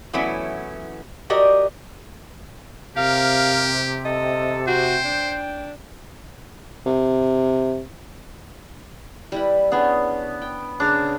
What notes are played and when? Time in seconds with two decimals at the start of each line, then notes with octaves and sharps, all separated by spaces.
0.13 E3 F#3 A3 B3 C#4 E4
1.30 F#4 G4 A#4 D5 D#5
2.97 C3 G4 A#4 F5
4.05 A4 D#5
4.67 F#4 C5 G5
5.05 D4
6.86 C3
9.32 G3 E4 B4
9.72 B3 C#4 D4 G#4
10.42 G5
10.80 C#3 D4 G#4 A#4